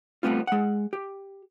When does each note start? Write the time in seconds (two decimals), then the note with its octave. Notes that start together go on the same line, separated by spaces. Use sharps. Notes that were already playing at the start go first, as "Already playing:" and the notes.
0.23 G3 A3 B3 C4 F4
0.47 G#3 F#5
0.93 G4